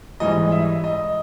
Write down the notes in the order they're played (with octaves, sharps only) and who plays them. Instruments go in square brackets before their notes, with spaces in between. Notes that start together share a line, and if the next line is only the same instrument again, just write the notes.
[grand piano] G#2 E3 G3 D#5
E5
D#5